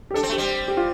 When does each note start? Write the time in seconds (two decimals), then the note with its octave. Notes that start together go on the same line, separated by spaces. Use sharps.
0.11 G4
0.14 D4 A4
0.23 C4
0.29 A3
0.33 G4
0.38 G3 C4
0.68 G4
0.77 F4